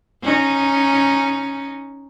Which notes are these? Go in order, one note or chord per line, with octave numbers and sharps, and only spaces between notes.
C#4 D#4